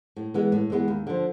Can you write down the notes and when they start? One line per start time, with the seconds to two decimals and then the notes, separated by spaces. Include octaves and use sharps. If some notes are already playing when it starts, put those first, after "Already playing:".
0.16 A2
0.34 E3 G#3 B3
0.52 A2
0.70 E3 G#3 B3
0.88 D#2
1.07 D3 F3